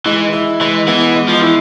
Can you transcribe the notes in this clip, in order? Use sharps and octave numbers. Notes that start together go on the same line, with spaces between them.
E3 G#3
E4
E3 G#3
E3 B3
G#3
F3
E3 E4